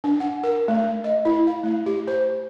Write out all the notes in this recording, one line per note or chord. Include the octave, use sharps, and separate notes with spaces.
D4
F#5
A#4
A3
D#5
E4
F5
A3
G4
C5